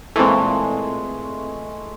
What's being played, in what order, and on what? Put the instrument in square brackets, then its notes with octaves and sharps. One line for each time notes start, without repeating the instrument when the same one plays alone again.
[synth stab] A#2 E3 [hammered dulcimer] G#3 A3 [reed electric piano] C4 A4